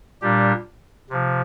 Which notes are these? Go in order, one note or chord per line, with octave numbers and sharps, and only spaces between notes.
A#2 G3 D4 G4
C3 F3